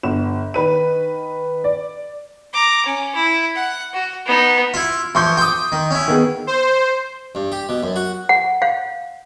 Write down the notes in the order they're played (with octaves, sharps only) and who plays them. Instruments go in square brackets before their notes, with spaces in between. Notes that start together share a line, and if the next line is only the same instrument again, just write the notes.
[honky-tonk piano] G1 E7
D#3 B4 D#7
D5
[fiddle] A#5 D6
C#4
E4
F#5
F#4
B3 D#4
[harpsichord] E4 F4
[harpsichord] E3 F3 [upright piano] C6 C#6 G6
[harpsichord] G5 D6 [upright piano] C6 D#6
[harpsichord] D#3
C#4 E4
[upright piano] D#3 B3 G#4
[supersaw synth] C5
[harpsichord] G2
G4
B2
F#2
F#4
[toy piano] F#5
F5